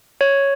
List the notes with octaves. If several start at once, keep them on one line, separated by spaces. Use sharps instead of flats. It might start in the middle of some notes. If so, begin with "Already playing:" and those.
C#5